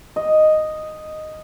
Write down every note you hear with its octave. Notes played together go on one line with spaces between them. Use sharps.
D#5